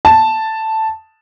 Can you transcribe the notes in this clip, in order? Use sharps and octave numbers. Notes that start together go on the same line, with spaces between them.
A5